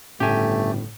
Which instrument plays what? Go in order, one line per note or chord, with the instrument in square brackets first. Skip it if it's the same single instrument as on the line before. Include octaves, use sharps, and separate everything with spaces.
[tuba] G1 [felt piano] A2 C#3 [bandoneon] A3 [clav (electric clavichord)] G4 G#5